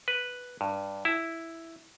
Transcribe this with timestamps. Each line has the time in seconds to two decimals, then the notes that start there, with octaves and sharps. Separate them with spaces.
0.08 B4
0.61 G2
1.05 E4